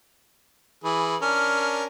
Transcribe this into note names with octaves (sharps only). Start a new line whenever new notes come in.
E3 G#4 B5
C#4 D4 A#4 F6